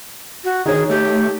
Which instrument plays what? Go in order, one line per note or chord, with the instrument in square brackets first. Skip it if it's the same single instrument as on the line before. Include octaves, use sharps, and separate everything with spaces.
[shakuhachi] F#4
[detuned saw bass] D#3 [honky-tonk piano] D#4 C#5 [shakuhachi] G#4
[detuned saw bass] A3 [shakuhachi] G4